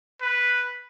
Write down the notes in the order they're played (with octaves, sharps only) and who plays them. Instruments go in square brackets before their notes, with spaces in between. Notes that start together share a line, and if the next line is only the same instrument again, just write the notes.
[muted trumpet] B4